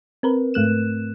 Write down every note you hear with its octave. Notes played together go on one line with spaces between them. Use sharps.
C4 A#4 B4
G#2 A3 F#6 E7